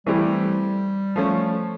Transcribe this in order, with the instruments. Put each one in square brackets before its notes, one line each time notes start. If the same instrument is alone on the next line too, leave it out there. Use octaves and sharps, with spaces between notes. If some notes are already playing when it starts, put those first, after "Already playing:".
[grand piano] E3 A3 C4 E4 G4 [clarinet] G3
[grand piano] F3 A3 C#4